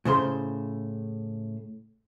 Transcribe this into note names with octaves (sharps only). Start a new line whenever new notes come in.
A2 C#3 C5 C6